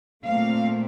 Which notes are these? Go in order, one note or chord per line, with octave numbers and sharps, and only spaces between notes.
A#2 A3 C4 F5